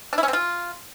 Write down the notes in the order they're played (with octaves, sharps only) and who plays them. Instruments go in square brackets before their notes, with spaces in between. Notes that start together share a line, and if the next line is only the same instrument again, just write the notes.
[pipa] D4
E4
C#4
C4
F4